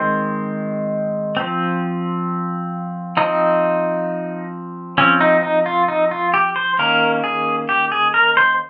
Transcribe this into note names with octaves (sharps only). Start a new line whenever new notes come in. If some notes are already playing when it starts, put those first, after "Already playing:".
Already playing: D#3 G#3 C4 C5
F3 C4
F3 C4 D#4
F3 C4 C#4
D#4
D#4
F4
D#4
F4
G4
C5
D#3 A#3 C#4 A#4
G#4
G4
G#4
A#4
C5